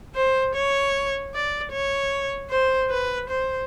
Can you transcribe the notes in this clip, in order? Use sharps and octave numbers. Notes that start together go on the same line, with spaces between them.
C5
C#5
D5
C#5
C5
B4
C5